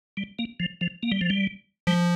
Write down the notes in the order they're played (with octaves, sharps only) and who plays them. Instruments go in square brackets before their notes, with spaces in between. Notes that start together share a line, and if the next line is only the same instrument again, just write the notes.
[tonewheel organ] G3
A#3
F3
F3
A#3
G3
F3
G3
[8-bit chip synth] F3 [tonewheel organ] G3